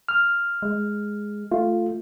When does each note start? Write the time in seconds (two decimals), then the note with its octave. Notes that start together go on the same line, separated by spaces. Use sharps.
0.09 F6
0.62 G#3
1.52 A3 F4